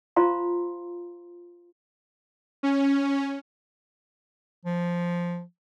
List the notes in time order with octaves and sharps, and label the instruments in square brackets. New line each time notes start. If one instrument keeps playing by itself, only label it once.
[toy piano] F4 C5 F5 A#5 C6
[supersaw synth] C#4
[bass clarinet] F3